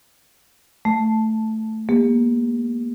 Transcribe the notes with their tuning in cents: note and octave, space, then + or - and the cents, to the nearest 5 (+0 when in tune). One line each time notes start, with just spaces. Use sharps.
A3 +0 A5 +0
A#3 +35 G4 +45